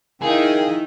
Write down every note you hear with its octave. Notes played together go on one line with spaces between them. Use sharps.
D#3 D#4 E4 G#4 A#4 F5 G5